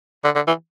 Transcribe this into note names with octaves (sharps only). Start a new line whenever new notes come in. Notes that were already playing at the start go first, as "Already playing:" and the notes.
D3
D3
E3